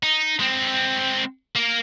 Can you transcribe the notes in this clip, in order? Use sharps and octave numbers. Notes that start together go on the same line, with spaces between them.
D#4
G#3 C4
A#3 A#4